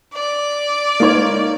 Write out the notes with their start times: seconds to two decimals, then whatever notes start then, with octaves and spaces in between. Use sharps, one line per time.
0.14 D5
1.00 A#3 D#4 C#5